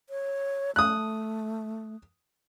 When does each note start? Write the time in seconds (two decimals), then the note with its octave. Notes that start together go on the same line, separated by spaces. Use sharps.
0.10 C#5
0.76 A3 D#6 F#6